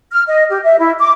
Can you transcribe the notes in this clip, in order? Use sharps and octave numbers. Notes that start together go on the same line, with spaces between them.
F6
D#5
G4
E5
E4
D6